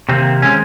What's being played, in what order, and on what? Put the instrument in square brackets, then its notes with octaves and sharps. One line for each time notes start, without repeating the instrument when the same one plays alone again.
[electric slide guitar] C3 D#3 A#3 C4
D#3 G#3 C4 C#4